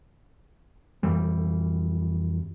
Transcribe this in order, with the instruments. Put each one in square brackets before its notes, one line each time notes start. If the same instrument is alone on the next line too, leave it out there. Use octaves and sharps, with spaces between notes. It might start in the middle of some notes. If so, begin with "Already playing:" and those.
[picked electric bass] F2 E3 G3